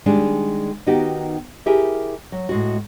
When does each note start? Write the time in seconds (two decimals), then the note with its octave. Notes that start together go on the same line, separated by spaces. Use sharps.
0.06 D#3 G3 G#3 D4 G#4
0.87 D#3 B3 D#4 F#4 G4
1.66 E4 G4 G#4 A#4 E5
2.32 F#3
2.49 A2 G#3 F#4